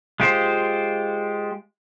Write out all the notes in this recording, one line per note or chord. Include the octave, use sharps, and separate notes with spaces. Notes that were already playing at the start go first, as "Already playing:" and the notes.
G#3 F4 G4 C5